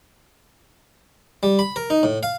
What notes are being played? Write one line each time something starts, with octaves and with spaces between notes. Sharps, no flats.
G3
B5
A#4
D#4
A2
F5